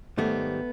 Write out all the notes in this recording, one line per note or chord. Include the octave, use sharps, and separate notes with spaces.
G#2 D#3 G3 A3 B3